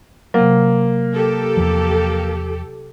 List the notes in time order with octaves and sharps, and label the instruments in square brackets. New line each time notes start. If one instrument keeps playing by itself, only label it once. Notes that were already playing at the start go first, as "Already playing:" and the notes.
[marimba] C3 F#3 [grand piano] A#3
[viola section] G4 A4
[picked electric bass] E2 F3